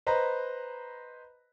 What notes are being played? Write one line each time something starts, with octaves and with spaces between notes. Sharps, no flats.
B4 C5 D#5 A#5 B5